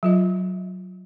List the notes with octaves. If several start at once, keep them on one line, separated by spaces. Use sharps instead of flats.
F#3 F4 D#5